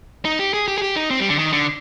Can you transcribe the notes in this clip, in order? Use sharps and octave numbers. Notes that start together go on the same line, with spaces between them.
D#4
G4
G#4
G4
G#4
G4
D#4
C4
G3
D3
D#3
D3